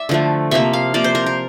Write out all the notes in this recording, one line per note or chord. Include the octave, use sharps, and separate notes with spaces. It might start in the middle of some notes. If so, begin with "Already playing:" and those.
Already playing: D5 E5
D3 F3 A3
C3 F3 A#3 E5
F5
C3 F3 A#3 D5
C5
A#4
A#4